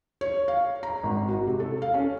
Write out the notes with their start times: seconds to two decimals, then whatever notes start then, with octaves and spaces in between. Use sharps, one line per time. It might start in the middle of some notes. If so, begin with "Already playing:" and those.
0.21 C#5
0.48 F5
0.83 A#5
1.03 G#1
1.28 F#4
1.47 C3
1.60 A4
1.82 F5
1.94 C#4